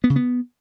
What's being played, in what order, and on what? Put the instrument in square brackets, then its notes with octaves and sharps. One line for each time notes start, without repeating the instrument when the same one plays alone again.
[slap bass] B3
C#3
B3